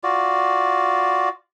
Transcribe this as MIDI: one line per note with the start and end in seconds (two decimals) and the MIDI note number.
0.03 1.29 65
0.03 1.29 66
0.03 1.29 74